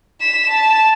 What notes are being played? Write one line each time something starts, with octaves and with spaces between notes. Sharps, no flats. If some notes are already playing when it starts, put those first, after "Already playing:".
B6 E7
A5